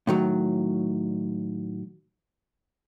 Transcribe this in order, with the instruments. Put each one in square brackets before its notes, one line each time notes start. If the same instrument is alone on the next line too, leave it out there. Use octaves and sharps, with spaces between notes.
[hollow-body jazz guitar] A2 D#3 F#3